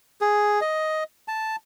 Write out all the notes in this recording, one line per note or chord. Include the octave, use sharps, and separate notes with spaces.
G#4
D#5
A5